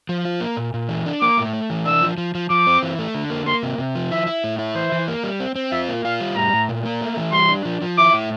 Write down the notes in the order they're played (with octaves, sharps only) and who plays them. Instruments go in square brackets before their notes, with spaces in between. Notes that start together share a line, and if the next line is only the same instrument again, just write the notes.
[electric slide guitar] F3
F4
A#3
A#2
A#2
E3
D4
[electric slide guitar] A#3 [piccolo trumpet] D6
[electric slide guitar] A2
A3
E3
[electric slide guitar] D4 [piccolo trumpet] E6
[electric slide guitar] F3
F3
F3
[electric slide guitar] F3 [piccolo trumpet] D6
[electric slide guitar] C4
E3
A3
D3
A#3
[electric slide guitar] A#3 [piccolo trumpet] C6
[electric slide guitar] C3
C3
F3
[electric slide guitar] E4 [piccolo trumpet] E5
[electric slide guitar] E4
A2
E4
[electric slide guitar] E3 [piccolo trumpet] C5
[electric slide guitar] E3
A#3
G3
C4
C4
[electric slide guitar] F4 [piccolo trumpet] E5
[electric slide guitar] A#3
[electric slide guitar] F4 [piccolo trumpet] F5
[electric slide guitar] G3
[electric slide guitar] A2 [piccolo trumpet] A#5
[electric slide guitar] A2
A#2
A#3
A3
E3
[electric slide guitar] G3 [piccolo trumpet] C6
[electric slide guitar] D4
F3
F3
[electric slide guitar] E4 [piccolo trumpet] D6
[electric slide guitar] A2